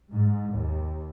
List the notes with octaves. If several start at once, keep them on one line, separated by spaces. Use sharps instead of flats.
G#2
D#2